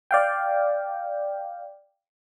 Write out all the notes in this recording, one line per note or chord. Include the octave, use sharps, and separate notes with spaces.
D5 F5 G5